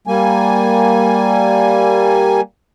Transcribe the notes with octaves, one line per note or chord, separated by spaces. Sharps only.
G3 A#3 G#5